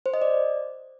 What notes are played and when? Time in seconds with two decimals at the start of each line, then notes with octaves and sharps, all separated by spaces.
0.06 C5
0.14 D#5
0.22 D5